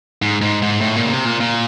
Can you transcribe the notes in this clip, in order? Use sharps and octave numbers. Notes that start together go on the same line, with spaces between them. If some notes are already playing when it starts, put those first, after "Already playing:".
G#2
G#2
G#2
A2
A#2
C#3
C3
A#2
A#2